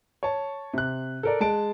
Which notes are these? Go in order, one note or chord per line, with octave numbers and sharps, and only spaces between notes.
C#5 A5
C3 F#6
A4 A#4 D5
G#3 A5 D7